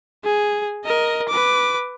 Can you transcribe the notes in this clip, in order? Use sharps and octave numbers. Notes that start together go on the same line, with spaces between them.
G#4
A#4 D#5
B4 D6